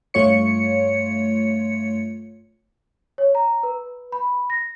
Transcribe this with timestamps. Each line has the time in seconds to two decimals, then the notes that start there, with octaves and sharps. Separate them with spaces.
0.14 G2 A3 F4 C#5 C#7
3.18 C#5
3.35 A#5
3.63 B4
4.12 B5
4.50 A#6